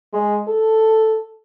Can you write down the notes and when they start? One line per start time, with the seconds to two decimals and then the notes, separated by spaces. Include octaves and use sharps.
0.13 G#3
0.48 A4